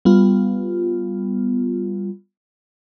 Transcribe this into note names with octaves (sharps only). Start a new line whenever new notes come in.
G3 B3 F4